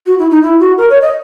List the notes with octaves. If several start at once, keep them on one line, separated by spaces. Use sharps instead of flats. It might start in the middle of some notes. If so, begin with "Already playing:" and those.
F#4
E4
D#4
E4
F#4
A#4
C#5
D#5